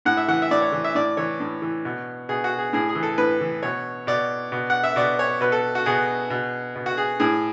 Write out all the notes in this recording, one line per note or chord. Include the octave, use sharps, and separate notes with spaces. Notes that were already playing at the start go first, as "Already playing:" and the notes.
A2 F#5
E5
E3 F#5
E5
A2 D5
C#5
E3
E5
A2 D5
E3 C#5
A2
E3
B2
B2 G#4
F#4
G#4
A2 G#4
G#4
E3
A4
A2 B4
E3
B2 C#5
B2 D5
B2
F#5
E5
B2 D5
C#5
B2 B4
A4
F#4
B2 G#4
B2
B2
F#4
G#4
A2 G#4